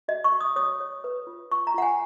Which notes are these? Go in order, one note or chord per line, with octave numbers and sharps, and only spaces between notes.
F#4 D#5
C#6
F#4
D#6
C#5 D#6
C#5
B4
F4
F4 C#6
A#5
F4 F#5
G#5